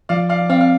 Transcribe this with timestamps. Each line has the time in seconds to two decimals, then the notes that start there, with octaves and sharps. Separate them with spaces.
0.09 F3 D5 F5
0.29 D5 F5
0.49 C4 D5 F5
0.61 F5